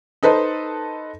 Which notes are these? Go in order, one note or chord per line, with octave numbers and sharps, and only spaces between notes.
D#4 A4 B4 C5 D#5